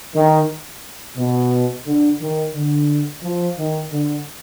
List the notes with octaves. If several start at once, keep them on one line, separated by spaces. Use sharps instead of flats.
D#3
B2
D3
D#3
D3
F3
D#3
D3